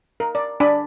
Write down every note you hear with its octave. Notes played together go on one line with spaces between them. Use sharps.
A#4
D5
D4 D5 G#5 B5